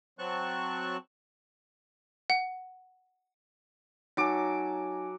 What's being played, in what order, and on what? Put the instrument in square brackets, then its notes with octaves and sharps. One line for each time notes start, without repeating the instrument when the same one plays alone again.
[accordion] F#3 C4 A5 C#6 F#6
[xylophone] F#5
[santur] F#3 D6 [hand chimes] D#4 G#5